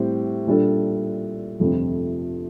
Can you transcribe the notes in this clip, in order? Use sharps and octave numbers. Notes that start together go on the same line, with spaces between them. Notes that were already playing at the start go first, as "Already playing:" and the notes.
Already playing: A2 G3 C4 G4 C5
A#2 G3 D4 A4
G1 F2 C3 F3 A3